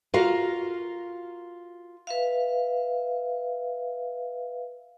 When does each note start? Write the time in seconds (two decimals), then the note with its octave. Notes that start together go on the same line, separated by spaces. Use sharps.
0.14 F4 F#4 A#4 F5
2.07 B4 E5 F5